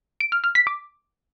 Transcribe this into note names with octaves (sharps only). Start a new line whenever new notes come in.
D7
F6
F6
B6
D6